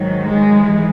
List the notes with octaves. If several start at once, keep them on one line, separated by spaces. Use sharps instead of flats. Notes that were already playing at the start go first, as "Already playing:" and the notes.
Already playing: G#2 D#3 F#3
G#3
G#2 E3